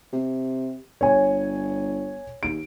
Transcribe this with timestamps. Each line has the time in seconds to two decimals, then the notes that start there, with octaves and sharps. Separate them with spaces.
0.13 C3
1.01 G1 C#5 G#5
2.43 D#2 D7